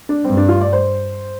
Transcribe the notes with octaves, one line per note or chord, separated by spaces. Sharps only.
D4
G2 C4
D4
F4
D5
C5